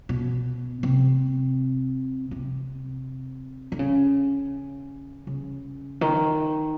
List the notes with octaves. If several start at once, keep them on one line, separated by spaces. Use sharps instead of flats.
B2
C3
C3
D3
C#3
C#3
D#3